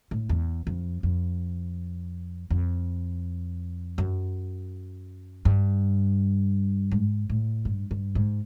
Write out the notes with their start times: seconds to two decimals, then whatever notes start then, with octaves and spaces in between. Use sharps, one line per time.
0.11 A2
0.29 E2
0.67 F2
1.03 F2
2.50 F2
3.98 F#2
5.45 G2
6.92 G#2
7.30 A2
7.65 G2
7.91 G2
8.15 G#2